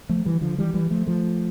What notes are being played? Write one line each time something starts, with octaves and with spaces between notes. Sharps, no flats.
F3 A3
E3 G3
D3 F3
E3 G3
E3 G3
F3 A3
F3 A3